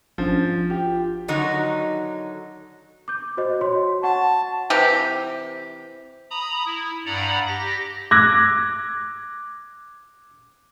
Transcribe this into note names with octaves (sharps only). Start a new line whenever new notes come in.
G#1 F3 C#4 D4
F4 G4
D3 D#3 F#3 D#4 F#4
D6 G6
F#4 C5 D#5
F#4 C#5 C6
F#5 A5 C#6
C3 E3 G4
A#5 B5 D#6
E4
G2 D5 F#5 A#5 B5
G4 A#6
D6 E6 F#6 G#6 A#6